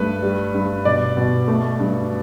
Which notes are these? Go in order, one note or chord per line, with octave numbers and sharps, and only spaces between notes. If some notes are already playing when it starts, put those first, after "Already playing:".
Already playing: G2 A3 B4
G3
G2
B2 D5
B2
A3
G2